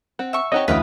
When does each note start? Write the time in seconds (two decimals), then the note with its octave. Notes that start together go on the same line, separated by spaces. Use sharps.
0.19 C4 F#5
0.33 E5 C#6
0.52 C4 D#4 G4 C#5 D#5 F#5
0.68 D2 E3 C#4 B4 F5 G5 D#6